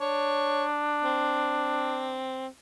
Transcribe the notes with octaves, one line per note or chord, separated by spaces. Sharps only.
D4 C#5
C4